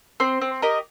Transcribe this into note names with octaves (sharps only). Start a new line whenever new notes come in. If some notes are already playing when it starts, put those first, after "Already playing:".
C4 C5
C4
G4 A#4 D#5